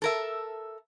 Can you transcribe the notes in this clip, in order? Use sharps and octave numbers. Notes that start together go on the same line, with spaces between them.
A4 A#4 E5